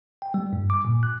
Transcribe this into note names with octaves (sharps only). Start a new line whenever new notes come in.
G5
G3
G2
D6
A#2
F#6